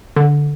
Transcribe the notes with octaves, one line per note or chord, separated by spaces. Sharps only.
D3